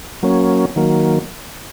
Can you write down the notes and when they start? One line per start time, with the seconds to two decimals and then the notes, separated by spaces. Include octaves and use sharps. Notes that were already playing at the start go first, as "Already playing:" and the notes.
0.23 F#3 A#3 C#4
0.76 D#3 F#3 A#3